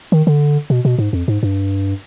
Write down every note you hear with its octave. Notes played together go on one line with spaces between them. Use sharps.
D#3
D3
B2
B2
G#2
F2
G#2
G2